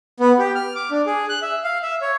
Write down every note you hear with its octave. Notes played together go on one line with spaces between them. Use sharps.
B3
G4
F6
D6
D4
G#4
F#6
E5
F5
E5
C#5